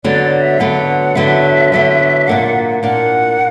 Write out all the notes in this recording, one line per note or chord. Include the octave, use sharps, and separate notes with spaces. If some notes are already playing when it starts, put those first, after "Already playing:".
D3 F#3 B3 D5
D5
E5
D3 F#3 B3 F#5
D3 F#3 B3 E5
D3 F#3 B3
A#2 A#3 D4 F#5
A#2 A#3 D4 F#5